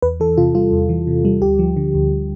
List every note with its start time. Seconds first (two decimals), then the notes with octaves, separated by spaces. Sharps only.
0.02 E2 B4
0.20 E3 A4
0.37 C3 F4
0.55 G3 F4
0.72 E2
0.89 E3
1.07 C3
1.25 G3
1.42 D2 G4
1.59 F3
1.76 D3
1.94 D2